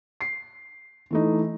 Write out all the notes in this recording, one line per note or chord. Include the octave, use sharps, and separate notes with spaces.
C7
E3 A3 D#4